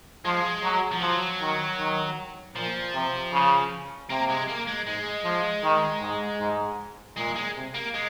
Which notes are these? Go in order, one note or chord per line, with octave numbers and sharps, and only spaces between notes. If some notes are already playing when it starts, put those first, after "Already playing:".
F3 G#3
F#3
F3
F3 F#3
D#3
D#3
A#2 F3
C3
C#3
C3 A#3
G#3
A#3
G#3
G#2 G#3
F3
D#3
G#2
G#2
A#2 G#3
G#3
C3
A#3
G#3